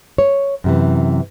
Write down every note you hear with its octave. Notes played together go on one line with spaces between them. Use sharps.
C#5
F#2 C3 E3